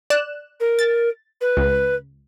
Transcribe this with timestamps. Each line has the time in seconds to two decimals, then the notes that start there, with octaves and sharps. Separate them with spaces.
0.10 D5 F#6 E7
0.60 A#4
0.79 A6
1.41 B4
1.57 C#2